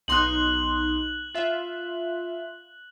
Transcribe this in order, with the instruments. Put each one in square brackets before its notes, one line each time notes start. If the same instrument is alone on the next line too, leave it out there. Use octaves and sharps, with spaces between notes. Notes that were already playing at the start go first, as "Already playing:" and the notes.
[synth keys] B1 D#4 C6 [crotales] F#6 F#7
[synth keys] F4 E5